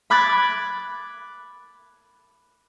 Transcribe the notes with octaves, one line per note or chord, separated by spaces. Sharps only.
B5 D6 F#6 G#6 A6